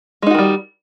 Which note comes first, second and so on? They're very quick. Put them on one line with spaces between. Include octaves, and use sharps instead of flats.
G#3 D#4 F#4 D#3 G3